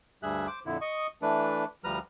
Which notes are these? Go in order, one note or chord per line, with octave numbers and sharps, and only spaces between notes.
D2 G2 G3 G#4 E5 F#6
C5 D6
F2 A#2 D3 E4
D#5 C#6 D#6
E3 A3 D4 B4
D2 F3 G3 B4 A#5 F6